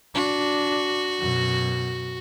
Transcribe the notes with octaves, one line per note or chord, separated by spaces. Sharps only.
D4 F#4
F#2 B2